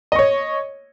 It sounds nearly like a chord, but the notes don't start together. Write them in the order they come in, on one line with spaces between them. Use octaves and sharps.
D#5 C#6 C#5